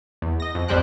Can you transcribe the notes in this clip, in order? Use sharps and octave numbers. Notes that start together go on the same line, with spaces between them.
E2
D#5 A#6
F2
G#1 F2 G3 C5 G5 F#6